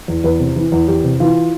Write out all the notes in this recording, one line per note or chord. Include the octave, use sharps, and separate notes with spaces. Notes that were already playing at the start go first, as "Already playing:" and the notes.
E2
E2 B4
C3
E3
E2
E2 G4
C3
E3 F4